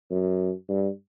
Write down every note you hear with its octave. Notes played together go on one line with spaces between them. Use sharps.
F#2
G2